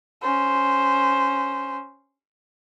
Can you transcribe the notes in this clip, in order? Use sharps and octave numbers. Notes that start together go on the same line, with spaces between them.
C#4 C5